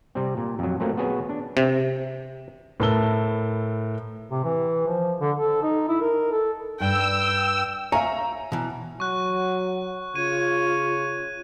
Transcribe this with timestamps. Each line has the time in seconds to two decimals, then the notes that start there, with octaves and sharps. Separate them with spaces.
0.15 C3 G3 C4
0.37 A#2
0.59 F2 F#3
0.80 A#2 F#3 A3 A#3 C4
0.97 B3 F#4 G#4 B4 C#5
1.29 D4
1.57 C3
2.80 A2 A#4 B4 A5 E6 G7
4.31 C3
4.44 E3
4.87 F3
5.21 D3
5.36 A4
5.63 D#4
5.88 E4
6.01 A#4
6.32 A4
6.80 G2 G5 E6
7.92 C#5 E5 F5 G#5 A#5
8.52 B2 E3
9.00 F#3 F#5 C#6 F#6
10.15 C#3 F4 C#5 D#7